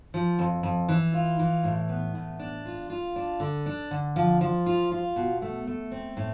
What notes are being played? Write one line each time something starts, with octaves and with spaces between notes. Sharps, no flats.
F3
F2
F2
E3
F4
E3
A2
B3
A2
D4
F4
F4
D4
D3
D4
D3
F3
F3
F4
F4
B2
A3
A3
C4
A2